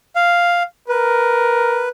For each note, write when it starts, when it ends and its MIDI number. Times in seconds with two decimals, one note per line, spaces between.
0.16 0.63 77
0.88 1.90 70
0.88 1.89 71